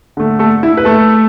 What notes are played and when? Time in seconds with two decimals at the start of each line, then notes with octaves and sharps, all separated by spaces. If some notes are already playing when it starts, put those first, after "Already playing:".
0.17 D3 A3
0.39 A3 A4
0.63 E4
0.77 B4
0.85 A3 A4